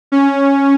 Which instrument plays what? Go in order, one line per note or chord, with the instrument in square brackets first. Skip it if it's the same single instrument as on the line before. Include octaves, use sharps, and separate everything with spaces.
[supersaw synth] C#4